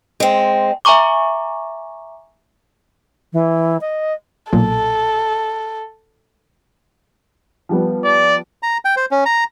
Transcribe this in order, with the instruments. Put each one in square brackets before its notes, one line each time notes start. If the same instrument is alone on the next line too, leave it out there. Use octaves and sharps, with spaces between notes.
[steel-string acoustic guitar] G#3 C4
[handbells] E5 G#5 A#5 C#6 D6
[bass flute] E3
D#5
[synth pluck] B1 A#2 [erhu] A4
[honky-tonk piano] F3 G3 B3
[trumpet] D5
[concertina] A#5
G5
C5
C#4
A#5